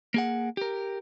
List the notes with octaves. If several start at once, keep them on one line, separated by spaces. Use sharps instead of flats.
A#3 G#4 F#5
G4 A#4